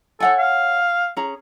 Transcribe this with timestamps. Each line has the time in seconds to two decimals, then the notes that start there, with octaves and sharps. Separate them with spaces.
0.20 A4 C#5 F#5 G#5
0.38 F5
1.17 C#4 G#4 A#5